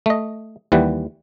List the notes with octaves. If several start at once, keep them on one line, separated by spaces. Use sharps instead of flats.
A3 D#5
D#2 E3 G3 F#5